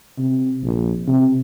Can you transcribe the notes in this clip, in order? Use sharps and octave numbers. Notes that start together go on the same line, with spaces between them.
C3
A#1
C3